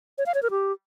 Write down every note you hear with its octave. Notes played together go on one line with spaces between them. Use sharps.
C#5
F5
C#5
A#4
G4